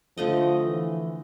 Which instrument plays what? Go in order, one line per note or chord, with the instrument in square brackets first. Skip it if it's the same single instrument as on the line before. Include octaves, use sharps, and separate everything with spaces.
[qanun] D3 A3 D#5 [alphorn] F3
[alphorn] E3